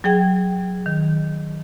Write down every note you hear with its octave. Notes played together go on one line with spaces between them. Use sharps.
F#3 G#4 G5 G#6
D#3